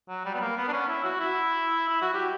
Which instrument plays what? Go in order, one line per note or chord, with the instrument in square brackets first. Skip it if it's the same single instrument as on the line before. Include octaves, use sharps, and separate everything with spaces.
[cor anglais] F#3
G3
B3
A#3
B3
D4
C#4
E4
F#4
E4
E4
F#4
G4